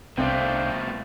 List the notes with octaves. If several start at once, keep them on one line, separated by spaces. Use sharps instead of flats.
C2 B2 A3 C4 D4 F5 G5